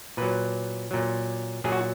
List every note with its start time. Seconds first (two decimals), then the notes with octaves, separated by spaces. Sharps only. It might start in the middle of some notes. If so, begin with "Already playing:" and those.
0.17 A#2 F#3 B4
0.91 A#2 F#3
1.64 A#2 F#3 G#4
1.72 F#4